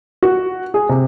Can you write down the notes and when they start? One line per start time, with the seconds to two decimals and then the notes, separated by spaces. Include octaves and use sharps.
0.23 F#4
0.74 G#4
0.89 C3